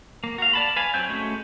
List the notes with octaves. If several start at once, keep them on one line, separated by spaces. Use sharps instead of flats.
A#3
F#4 F5
D5 A5 B5
B4 F5 G#5
F#3 C4 G#5 G6
G#3 A3 C#4 F#4